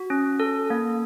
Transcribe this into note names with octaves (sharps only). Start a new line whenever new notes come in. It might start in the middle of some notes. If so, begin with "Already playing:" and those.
Already playing: F#4
C#4
A4
A#3